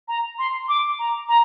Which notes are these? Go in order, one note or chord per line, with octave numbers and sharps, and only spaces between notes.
A#5
C6
D6
A#5
A#5